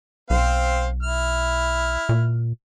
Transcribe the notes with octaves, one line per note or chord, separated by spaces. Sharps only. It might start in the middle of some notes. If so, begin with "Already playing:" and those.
B1 C4 C5 F5
E4 F6
A#2